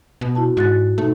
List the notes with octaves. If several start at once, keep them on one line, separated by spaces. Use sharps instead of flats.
B2
E4 F#4 A5
G#2 F#4 F#6 A6
B2 A3 D#4